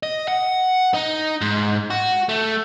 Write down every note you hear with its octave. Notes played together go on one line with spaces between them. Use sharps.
D#5
F#5
D#4
G#2
F#4
A3